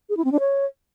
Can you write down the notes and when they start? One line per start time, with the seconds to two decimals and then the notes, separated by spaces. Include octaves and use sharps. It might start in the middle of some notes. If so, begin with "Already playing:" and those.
0.09 G#4
0.17 E4
0.25 C4
0.32 D4
0.40 C#5